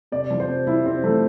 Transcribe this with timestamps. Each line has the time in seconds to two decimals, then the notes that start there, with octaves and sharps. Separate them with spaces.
0.12 C3 D5
0.30 F3
0.40 C5
0.49 C3
0.67 F3 E4
0.85 C3 C4
1.04 F3 A3